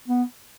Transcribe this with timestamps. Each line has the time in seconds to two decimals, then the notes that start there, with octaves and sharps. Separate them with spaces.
0.08 B3